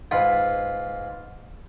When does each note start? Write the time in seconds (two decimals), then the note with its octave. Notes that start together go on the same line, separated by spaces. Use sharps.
0.11 G#2 F4 B4